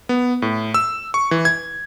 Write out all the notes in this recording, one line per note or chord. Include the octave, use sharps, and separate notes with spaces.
B3
A2
E6
C#6
E3
G#6